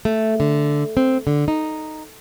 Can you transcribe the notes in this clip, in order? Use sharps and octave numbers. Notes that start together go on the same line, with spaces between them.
A3
D3
C4
D3
D#4